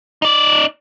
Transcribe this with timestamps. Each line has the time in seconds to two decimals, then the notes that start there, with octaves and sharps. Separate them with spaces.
0.22 D#4 D5